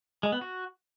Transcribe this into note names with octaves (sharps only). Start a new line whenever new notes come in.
G#3
B3
F#4